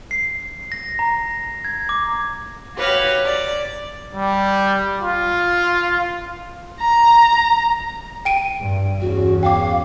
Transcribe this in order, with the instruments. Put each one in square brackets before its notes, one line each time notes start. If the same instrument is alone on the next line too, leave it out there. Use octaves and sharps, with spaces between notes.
[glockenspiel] C7
A#6
A#5
G#6
D6
[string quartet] F#4 G4 B4 C#5 F5
D5
[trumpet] G3
F4
[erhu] A#5
[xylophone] G5 D7 D#7
[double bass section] G2
[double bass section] E2 C#4 [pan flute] F#4
[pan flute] F5 [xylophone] G5 D6